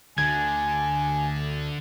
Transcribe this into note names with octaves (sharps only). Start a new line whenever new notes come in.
D2 D3 G#5 G#6